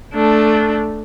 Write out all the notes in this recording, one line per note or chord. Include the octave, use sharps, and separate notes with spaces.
A3 D4